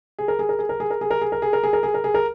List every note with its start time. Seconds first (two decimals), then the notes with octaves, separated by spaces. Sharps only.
0.19 G#4
0.28 A#4
0.39 G#4
0.49 A#4
0.59 G#4
0.69 A#4
0.80 G#4
0.91 A#4
1.01 G#4
1.11 A#4
1.21 G#4
1.32 A#4
1.42 G#4
1.53 A#4
1.63 G#4
1.73 A#4
1.83 G#4
1.94 A#4
2.04 G#4
2.14 A#4